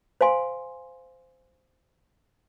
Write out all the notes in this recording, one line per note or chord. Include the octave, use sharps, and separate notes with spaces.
C5 F5 G#5 C6